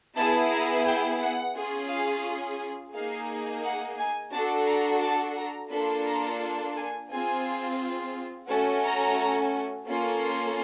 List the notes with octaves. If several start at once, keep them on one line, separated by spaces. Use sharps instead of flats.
B3 E4 G#4 A5
A#5
G5
F#5
C#4 F4 G#4
F5
A#3 D#4 G#4 F5
F#5
G#5
D4 F#4 A4 A5
A#5
A5
A#5
A#3 D4 F4 A4 B5
A#5
G#5
C4 F4 G#4 G#5
A3 C#4 F#4 A4 A5
A#5
A#3 C#4 F4 A4
C6